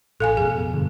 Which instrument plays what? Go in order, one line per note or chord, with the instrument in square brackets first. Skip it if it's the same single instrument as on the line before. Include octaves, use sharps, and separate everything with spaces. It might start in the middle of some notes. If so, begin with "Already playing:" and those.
[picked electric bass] A1 [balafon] A4 F5 G#5
[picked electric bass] F2 B2 [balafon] G#4
[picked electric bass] G2 D3